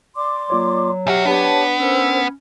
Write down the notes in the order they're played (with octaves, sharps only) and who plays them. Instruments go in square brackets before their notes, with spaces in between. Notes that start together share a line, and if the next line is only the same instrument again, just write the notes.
[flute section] D5 C6 D6
[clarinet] F#3 [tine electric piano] A#3 F4 C#5
[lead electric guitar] B1 F#4 [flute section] G4 [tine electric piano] E5 F6
[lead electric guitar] B3 [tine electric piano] D4 B4 [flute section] G4 C#5 A5
[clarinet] C#4 [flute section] A#4 C5 E6